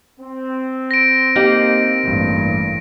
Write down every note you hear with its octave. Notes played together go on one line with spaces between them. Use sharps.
C4
A#6 D7
A#3 D#4 G4
A1 G2